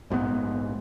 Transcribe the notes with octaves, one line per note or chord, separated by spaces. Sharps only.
A#1 G#2 E3 B3